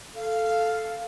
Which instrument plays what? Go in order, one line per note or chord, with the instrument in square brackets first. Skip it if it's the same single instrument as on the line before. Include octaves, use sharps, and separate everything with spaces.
[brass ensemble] A4 [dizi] F5